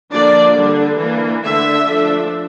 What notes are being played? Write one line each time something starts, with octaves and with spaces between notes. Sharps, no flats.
D3 F3 A#3 D4 D5
D3 G3 D4
E3 A#3 D4
D3 A3 D4 E5
F3 A3 D4